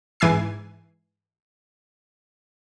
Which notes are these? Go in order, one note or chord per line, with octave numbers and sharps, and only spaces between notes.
G#2 E3 G#5 E6 C7